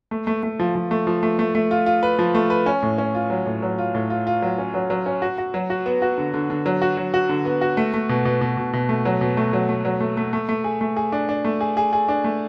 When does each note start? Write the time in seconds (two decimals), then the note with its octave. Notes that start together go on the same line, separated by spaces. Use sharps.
0.11 A3
0.27 A3
0.43 A3
0.59 F3
0.75 F3
0.91 A3
1.07 F3
1.23 A3
1.39 A3
1.55 A3
1.71 F4
1.86 F4
2.03 B4
2.19 F3
2.35 A3
2.50 B4
2.66 C#4
2.83 A2
2.98 C#4
3.15 F4
3.30 F#3
3.46 A2
3.62 F#3
3.78 F4
3.95 A2
4.10 F4
4.27 F4
4.42 F#3
4.58 C#4
4.74 F#3
4.90 F#3
5.06 C#4
5.22 F#4
5.38 F#4
5.54 F#3
5.70 F#4
5.86 B3
6.02 F#4
6.18 D3
6.34 D3
6.50 D3
6.66 F#3
6.82 F#4
6.97 F#3
7.14 F#4
7.29 D3
7.45 B3
7.61 F#4
7.77 A3
7.94 A3
8.09 B2
8.25 B2
8.41 B2
8.57 B2
8.73 B2
8.89 A3
9.05 F#3
9.21 B2
9.37 A3
9.53 F#3
9.69 A3
9.85 F#3
10.01 A3
10.17 A3
10.33 A3
10.49 A3
10.64 G#4
10.81 A3
10.97 G#4
11.12 D4
11.29 D4
11.45 A3
11.61 G#4
11.77 G#4
11.93 G#4
12.08 D4
12.24 A3